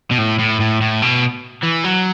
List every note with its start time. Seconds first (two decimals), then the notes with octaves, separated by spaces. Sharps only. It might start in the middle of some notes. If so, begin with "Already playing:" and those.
0.11 B2
0.18 A2
0.39 A2
0.60 A2
0.81 A2
1.02 B2
1.63 E3
1.84 F#3